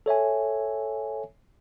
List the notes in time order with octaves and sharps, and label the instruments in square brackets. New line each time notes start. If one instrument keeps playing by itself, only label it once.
[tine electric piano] A4 C#5 E5 G#5